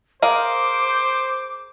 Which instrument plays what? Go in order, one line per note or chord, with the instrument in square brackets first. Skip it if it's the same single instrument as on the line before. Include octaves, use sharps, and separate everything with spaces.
[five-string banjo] G#4 A#4 F5 [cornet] C5 [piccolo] D6